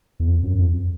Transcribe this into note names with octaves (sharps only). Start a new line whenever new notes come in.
E2
F2
F#2
F2